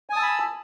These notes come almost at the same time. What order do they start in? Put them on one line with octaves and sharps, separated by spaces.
G#5 D#6 A5 E6 B5